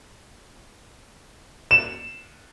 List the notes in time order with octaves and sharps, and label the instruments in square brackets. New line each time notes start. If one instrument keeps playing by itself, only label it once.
[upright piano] E7